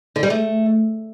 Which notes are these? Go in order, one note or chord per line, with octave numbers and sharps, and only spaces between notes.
D3
G3
A3